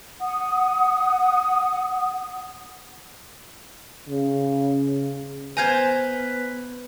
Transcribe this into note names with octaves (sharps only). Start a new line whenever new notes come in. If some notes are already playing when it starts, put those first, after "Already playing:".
F#5 D#6
C#3
B3 B4 C5 F5 G#5 A#5 G6 G#6